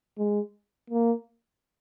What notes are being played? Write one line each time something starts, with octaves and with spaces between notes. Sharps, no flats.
G#3
A#3